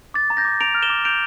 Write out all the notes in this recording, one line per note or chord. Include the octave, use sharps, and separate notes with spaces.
D6 A6
A#5
G6 A#6
D6
A#5 D7 F7
F6
E7 G7
D6
G6 D7 F7